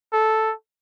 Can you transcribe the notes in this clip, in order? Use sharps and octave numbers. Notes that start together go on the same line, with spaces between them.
A4